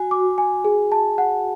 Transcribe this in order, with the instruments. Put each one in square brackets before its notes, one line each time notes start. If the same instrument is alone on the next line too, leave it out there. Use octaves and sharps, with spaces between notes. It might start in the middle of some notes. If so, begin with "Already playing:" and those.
Already playing: [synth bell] F#4 [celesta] G#5
[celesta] D6
G#5
G#4
A5
F#5